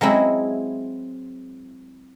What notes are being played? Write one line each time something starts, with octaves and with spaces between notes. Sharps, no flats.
F#3 G#3 C4 E4